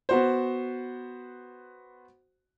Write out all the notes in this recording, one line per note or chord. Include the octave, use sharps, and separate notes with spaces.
B3 F#4 C5